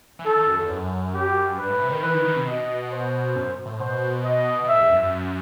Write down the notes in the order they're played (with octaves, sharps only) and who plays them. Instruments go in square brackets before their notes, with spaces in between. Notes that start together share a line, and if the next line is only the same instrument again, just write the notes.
[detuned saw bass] E3
[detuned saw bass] D#3 [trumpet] A4
[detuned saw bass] D#3
F#2
E2
F#2
[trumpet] G4
[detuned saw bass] G2 [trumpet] B4
[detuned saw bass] A2
C3
D#3
[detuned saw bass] E3 [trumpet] B4
[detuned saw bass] D#3
D#3
C3
[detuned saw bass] B2 [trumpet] D#5
[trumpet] C5
[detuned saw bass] F#2
A2
[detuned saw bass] B2 [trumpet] C5
[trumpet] D#5
[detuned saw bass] B2
[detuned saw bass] A2 [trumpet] E5
[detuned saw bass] E2
F#2
F#2